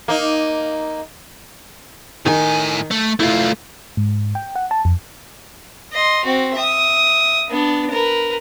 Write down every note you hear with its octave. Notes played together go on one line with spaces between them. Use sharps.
A#3 D#4
A2 D#3 G#5
A3
A3 E4 F4
G#2
G5
F#5
A5
F2
D#5 C6
C4 F#4
E5 D#6
B3 D4
A#4 B4